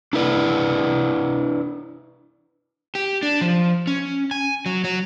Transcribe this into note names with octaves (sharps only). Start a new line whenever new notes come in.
D4 E4 B4 D5
G4
D4
F3
C#4
G#5
F#3
F#3